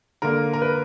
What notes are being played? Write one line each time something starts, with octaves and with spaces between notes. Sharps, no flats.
D3 A#3 A#4
A#4
B4